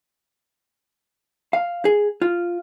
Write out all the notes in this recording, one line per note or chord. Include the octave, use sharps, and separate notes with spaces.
F5
G#4
F4